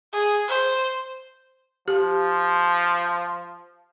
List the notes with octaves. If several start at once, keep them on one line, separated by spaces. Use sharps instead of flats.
G#4
C5
F3 G4